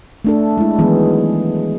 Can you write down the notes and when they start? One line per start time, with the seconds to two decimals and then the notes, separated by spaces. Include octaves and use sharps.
0.25 A3 D4 A4
0.57 G#3 E4
0.78 D#3 E3 F#3 G#3 B3 G#4